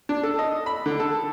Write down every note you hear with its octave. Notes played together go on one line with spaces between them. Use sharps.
D4
A4
D#5
B5
D3
A4